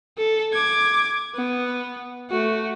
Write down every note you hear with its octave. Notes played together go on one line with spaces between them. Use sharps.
A4
D6 G#6
B3
A3 F#4